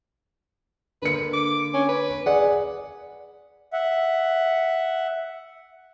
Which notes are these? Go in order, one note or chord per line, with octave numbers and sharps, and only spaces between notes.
D3 A#3 B4 C#7
D6
C#4
B4
G#4 D5 F#5
E5 F#5